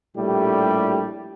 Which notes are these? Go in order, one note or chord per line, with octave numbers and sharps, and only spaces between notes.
A#1 A2 G3 G4